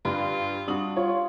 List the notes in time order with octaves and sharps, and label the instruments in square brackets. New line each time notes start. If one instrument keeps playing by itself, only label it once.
[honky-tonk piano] G2 [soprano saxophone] F4 [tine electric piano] B4
[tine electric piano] G3 F#4 [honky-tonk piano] D4 D#6 F#7
[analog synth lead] F4 [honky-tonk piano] C#5